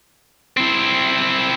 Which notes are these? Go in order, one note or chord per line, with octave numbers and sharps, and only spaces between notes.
C4 E4